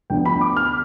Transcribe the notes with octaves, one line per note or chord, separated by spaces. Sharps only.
D2 D3 F3 B3 G5
B5
D6
F6